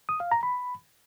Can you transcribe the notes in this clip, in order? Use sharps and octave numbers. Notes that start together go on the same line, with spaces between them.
D#6
F5
A#5
B5